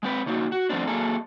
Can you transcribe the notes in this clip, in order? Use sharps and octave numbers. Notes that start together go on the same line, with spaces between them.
G#3 C4 B4
C#3 A#3 D#4 F#4
F#4
F3 A3 B3 C4 D4
F#3 A#3 G#4 A4